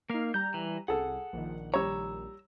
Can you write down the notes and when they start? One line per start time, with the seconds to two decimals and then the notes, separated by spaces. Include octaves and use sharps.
0.10 A#3 D#4 F5 F6
0.34 G3 A#5 G6
0.54 E3
0.88 C2 G#4 A4 F#5
1.33 A#1 D#3
1.74 G3 C#5 A#5 E6